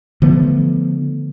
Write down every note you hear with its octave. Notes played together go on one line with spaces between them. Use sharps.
D3 F3 A3 B3